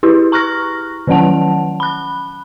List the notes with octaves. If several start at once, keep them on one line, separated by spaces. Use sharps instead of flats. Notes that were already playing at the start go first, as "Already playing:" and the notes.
E4 G4 G#4 B4
A#5 C#6 F6 F#6 A#6
D#3 F3 F#3 C#4 F#5 A5
B5 F#6